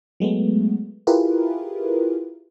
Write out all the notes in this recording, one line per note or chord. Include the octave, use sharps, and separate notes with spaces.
F#3 G#3 A3 B3
E4 F4 G4 G#4 A#4 B4